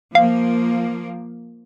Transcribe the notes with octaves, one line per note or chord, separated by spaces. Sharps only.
F3 A#3 F5